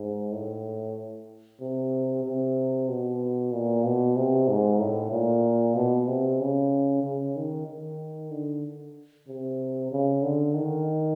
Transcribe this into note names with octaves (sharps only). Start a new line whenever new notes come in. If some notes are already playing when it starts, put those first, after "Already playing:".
Already playing: G#2
A2
C3
C3
B2
A#2
B2
C3
G#2
A2
A#2
B2
C3
C#3
C#3
D#3
D#3
D3
C3
C#3
D3
D#3